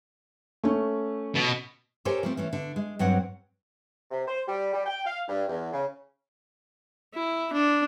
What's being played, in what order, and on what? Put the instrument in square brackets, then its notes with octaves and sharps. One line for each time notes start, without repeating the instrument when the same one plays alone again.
[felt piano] A3 C#4
[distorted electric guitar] B2
[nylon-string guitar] G4 A4 A#4 C5 C#5 G#5
F3 A3 C4
E3 A3 C#4
D3
G#3
G2 F#3 C4 C#5 F#5
[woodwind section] C3
C5
G3
G3
G5
F5
G2
E2
C#3
[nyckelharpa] E4
D4